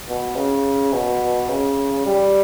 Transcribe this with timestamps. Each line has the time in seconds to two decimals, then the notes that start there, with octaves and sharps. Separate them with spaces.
0.08 B2
0.36 C#3
0.93 B2
1.49 C#3
2.06 G3